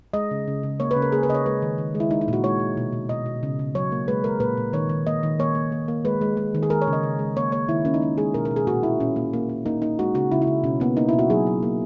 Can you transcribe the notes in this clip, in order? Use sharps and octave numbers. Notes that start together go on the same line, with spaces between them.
G#3 D#5
C#3
C#3
C#3
A#3 C#5
B4
C#3
A#4
A#3 G#4
B4
C#3 D#5
C#5
G#3 B4
D#3
D#3
G#3
E4
G#3 D#4
D#4
A#2 F#4
G#3 C#5
A#2
B2
B2
B2 D#5
B2
C#3
C#3
F#3 C#5
A#3
G#3 B4
G#3 A#4
A#2 B4
A#2
D#3 C#5
D#3
A#3 D#5
D#3
A#3 C#5
A#3
A#3
A#3
G#3 B4
G#3
G#3
D#3
G#4
G#3 A#4
C#5
C#3
D#5
C#3
G#3
A#3 C#5
A#3 C#5
D#3 E4
A#3 C#4
D#4
G#3 C#4
G#3 G#4
B2 A#4
A#4
B2
G#4
A#2 F#4
A#3 E4
A#2 C#4
A#3
A#3
A#3
A#3 D#4
A#3 D#4
G#3 F#4
C#3 F#4
C#3 E4
E4
C#3
B2 C#4
A#3 B3
A#3 D#4
B2 E4
F#4
F#3 G#4
F#3
A#3